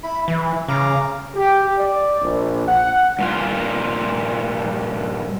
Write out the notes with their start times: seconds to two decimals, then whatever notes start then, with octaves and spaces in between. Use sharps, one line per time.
0.03 E4 B5
0.28 E3 E4
0.68 C#3 F5 A#5 D6
1.36 G4
1.77 D5
2.21 A#1
2.68 F#5
3.19 G2 A#2 F4